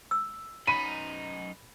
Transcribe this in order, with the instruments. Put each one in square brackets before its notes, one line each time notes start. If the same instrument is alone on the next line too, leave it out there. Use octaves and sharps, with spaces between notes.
[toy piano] E6
[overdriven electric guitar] F#2 D#4 [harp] B5 [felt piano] D#7